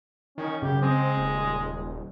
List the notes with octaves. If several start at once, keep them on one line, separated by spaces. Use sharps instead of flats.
D#3 C#4
F#2 C#3 G4
G#3 C4
D#1